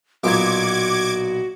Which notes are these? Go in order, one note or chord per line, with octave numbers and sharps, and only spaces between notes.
B1 A#2 F#4 D6 G#6